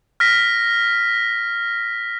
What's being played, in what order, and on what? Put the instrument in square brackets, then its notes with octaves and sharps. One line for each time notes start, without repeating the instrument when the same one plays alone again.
[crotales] F6 A#6 B6